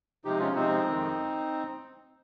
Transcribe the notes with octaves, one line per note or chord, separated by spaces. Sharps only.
C3 F3 G#3 D#4 G4
C#4 F4
C3 F3 G#3 C4 D#4
F2 D#3 G#3